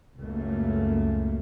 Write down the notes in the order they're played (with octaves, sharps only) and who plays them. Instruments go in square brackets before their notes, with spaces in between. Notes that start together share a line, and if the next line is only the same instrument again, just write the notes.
[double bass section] C#2 F#2 A3 A#3